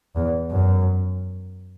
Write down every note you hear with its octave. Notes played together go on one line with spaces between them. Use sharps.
E2
F#2